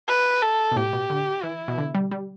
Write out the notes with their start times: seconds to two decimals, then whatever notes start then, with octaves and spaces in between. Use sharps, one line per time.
0.08 B4
0.42 A4
0.72 B2
0.76 A2 G4
0.93 B2
1.10 D3
1.43 E3 E4
1.68 B2
1.78 D3
1.95 G3
2.11 G3